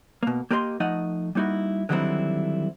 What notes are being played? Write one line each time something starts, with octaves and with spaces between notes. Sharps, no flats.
B2 A#3
A#3 G4 A#4 D#5 B5 C6
F3 A3 D#4 D#5 F#5
G3 A#3 D#4 E4 F#4
D3 D#3 F#3 G3 C4 E4